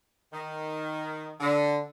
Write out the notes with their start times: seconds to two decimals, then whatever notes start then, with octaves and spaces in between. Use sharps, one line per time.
0.33 D#3
1.40 D3